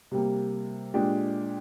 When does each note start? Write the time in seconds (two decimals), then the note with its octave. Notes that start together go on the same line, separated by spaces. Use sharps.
0.11 C3 G3 A#3
0.94 A#2 G#3 D4 G4